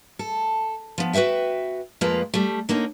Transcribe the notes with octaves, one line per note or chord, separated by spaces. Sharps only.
A4
F3 B3
F#4 B4 C5 E5 G5
F2 F3 G#3 A#3 F4 B4
G3 A3
D3 A#3 C#4 D#4